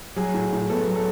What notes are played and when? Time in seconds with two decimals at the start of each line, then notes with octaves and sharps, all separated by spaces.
0.16 F#3 G#4
0.34 A2
0.52 A2
0.70 B3 A4
0.87 F#3
0.96 A4